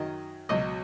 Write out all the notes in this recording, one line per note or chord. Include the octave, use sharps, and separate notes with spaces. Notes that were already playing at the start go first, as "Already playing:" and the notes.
Already playing: F#2 D#3 F#3 D#5
C#2 B2 F#3 D#5